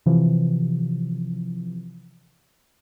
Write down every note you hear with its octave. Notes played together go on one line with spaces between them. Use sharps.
C3 E3 F3